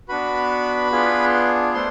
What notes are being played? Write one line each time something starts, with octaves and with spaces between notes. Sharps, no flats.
B3 D4 F#4 B4 B5
B3 D4 F4 G#4
A3 D4 A4 C5 C6